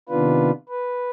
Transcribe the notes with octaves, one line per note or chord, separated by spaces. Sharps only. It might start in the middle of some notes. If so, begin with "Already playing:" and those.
C3 D#3 B3 D4 F4 B4
B4